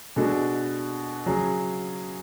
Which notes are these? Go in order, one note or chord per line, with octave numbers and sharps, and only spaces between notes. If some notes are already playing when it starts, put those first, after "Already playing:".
B2 G#3 D4 F#4 A4
C#3 F#3 C#4 G#4